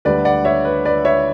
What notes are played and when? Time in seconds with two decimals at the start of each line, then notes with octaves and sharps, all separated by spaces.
0.05 D2 D3 G3 B4 D5
0.25 D5 F#5
0.45 C#5 E5
0.65 B4
0.85 B4 D5
1.05 C#5 E5